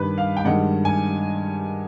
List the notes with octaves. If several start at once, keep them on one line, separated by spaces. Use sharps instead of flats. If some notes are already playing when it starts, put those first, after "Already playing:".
Already playing: G2 D#3 G3 B4
F5
G5
G2 D#3 G#3 F#5
G#5